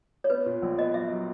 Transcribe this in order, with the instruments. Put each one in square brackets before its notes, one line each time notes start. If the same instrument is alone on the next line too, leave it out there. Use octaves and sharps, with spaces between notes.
[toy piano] C#5
[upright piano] B3 [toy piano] B4
[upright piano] A#2
A#1
[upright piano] B3 [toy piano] D#5
[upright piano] F#3 [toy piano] E5
[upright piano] F#3